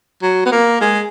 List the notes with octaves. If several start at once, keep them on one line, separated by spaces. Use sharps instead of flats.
F#3
B3
A#3
G#3